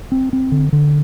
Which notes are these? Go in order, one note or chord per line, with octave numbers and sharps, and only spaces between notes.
C4
C4
D3
D3